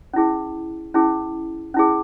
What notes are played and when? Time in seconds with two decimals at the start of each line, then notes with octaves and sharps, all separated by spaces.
0.14 C#4 E4 G#4
0.94 C#4 E4 G#4
1.74 C#4 E4 G#4